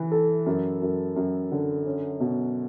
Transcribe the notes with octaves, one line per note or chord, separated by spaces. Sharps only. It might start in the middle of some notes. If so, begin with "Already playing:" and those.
Already playing: E3
A4
F#2
F#2
F#2
D3
C#4
B2